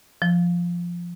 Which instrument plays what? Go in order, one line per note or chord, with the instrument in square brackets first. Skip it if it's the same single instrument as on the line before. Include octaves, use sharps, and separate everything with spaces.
[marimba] F3